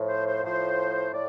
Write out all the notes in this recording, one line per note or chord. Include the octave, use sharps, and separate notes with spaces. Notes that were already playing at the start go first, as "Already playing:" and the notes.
Already playing: A2 F3
C5
C5
A2 F3 C5
A2 D5